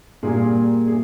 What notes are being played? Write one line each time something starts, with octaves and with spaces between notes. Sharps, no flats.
A#2 G3 A#3 G#4
G#4